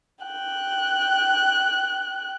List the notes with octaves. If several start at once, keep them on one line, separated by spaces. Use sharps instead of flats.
G5 F#6